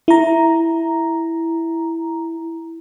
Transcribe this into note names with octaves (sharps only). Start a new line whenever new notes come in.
E4 A#5